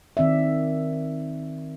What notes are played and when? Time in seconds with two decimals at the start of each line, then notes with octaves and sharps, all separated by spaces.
0.17 D#3 C4 D5 E5